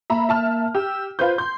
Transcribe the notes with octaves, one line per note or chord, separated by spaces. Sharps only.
A#3 E5 A#5 B5
E5 A5 F6
G4 E6
F4 B4 C5 G6
C6 G6